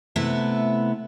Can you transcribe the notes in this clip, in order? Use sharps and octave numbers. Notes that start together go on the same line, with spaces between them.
C3 A3 B3 E4 E5